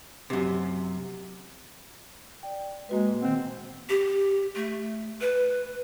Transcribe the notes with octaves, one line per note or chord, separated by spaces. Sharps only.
F#2 C3
D5 G5
G#3 A#3 F#4 B4
A#2
D#3 C4 F#5
G4
A3
B4